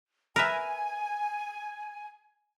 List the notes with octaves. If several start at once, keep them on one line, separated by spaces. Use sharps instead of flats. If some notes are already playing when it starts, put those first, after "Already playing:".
A#4 B4 E5 G#5